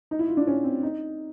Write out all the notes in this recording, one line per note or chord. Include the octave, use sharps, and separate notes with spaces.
D#4
E4
F4
D4
C#4
C4
D#4